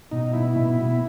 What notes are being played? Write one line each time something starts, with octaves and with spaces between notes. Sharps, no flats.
B2 D#4
B2 E4
B2
B2